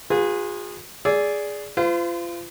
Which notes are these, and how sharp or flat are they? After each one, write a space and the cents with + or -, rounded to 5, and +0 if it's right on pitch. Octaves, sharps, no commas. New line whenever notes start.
F4 +35 G#4 -20 B4 +0
G#4 +0 D5 -15 E6 +0
F4 -25 C5 -45